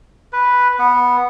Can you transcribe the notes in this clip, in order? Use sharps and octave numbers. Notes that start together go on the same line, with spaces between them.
B4
B3